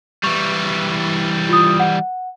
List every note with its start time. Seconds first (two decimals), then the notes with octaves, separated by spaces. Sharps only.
0.24 E3 G3 C#6
1.49 F4 D#6
1.80 F#5